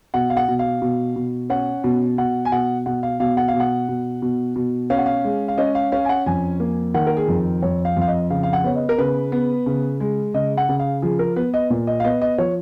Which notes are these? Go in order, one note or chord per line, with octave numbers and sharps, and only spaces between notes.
B2 F#5
F5
F#5
B2
F5
B2
B2
C#4 F#5
B2
B2 F#5
G#5
B2 F#5
B2 F#5
F5
B2 F5
F#5
F5
B2
F#5
B2
B2
B2
C#4 F5
F#5
F5
G#3
F5
C#4 D#5
F5
C#4 F5
G#5
F#5
F2 G#5
A#3
D#3 F#5
A#4
G#4
F2
F2 C#5
F5
F2 F5
D#5
C#3 F5
F5
F#5
B3 C#5
D#5
A#4
C#3 B4
B3
C#3
G#3
C#3 D#5
F#5
C#3
F5
F3 G#4
A#4
B3 B4
D#5
A#2
D#5
F5
B3 D#5
D#5
F3 C#5